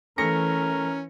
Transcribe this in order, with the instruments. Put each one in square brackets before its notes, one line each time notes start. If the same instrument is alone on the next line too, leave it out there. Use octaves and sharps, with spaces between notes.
[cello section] E3 [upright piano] A3 A#6 C#7 [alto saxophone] C#4 [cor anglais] A#4